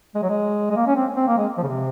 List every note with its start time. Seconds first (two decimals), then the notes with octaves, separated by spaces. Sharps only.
0.15 G#3
0.22 F#3
0.30 G#3
0.71 G#3
0.76 A#3
0.87 C#4
0.96 C4
1.16 C4
1.27 A#3
1.37 G#3
1.57 F3
1.63 C#3
1.68 C3